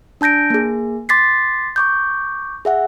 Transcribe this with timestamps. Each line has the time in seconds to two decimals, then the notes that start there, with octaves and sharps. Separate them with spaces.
0.21 D4 A5 G6 A#6 D7
0.50 A#3 G#4
1.09 C6 D6 A6 B6 C7
1.76 C#6 D6 G6
2.65 G#4 E5 F#5